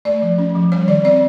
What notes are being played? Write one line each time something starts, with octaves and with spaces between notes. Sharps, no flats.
A3 D5
F3
C#4
F3
G3 C#5
D#3 D5
C4 D5